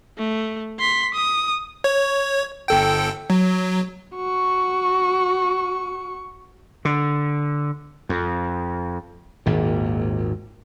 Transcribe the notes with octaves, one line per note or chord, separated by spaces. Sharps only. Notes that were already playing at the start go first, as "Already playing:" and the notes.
A3
C6 B6
D#6
C#5
G1 A4 G5
F#3
F#4 C#6
D3
F2
G#1 D#2 A#2